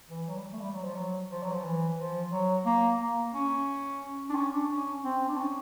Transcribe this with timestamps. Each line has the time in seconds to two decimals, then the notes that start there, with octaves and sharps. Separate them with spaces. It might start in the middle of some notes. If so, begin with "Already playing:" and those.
0.10 E3
0.28 F#3
0.36 G3
0.53 A3
0.61 G3
0.73 F#3
0.84 F3
0.95 F#3
1.30 F3
1.43 F#3
1.53 F3
1.63 E3
1.98 F3
2.31 F#3
2.66 A#3
2.99 A#3
3.33 C#4
4.30 D4
4.35 C#4
4.52 D4
4.70 C#4
5.03 C4
5.29 D4
5.37 C#4